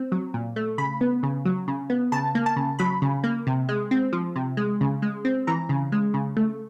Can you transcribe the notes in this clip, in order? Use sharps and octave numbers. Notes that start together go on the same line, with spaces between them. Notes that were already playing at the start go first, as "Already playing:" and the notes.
Already playing: C4
F#3
A#2
A3
C#3 B5
B3
C#3
F#3
C#3
B3
C#3 A5
A#3
A5
C#3
F#3 B5
C#3
A#3
C3
G#3
C4
F3
C3
G#3
C#3
G#3
C4
E3 A#5
C#3
G#3
C#3
A3